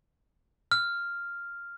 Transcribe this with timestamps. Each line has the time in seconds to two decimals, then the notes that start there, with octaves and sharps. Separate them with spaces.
0.71 F6